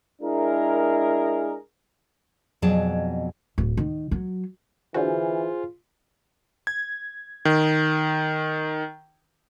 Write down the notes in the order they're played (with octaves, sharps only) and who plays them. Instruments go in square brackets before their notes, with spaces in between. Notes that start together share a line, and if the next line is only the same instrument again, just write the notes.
[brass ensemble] G#3 D4 E4 G#4 A#4
[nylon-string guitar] F2 B2 F#3 G#4 D5 A5
[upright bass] D1
D#3
F#3
[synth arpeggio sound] D3 F#4 [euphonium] E3 [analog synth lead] F4 [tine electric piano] G#4 C5 G#5
[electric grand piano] G#6
D#3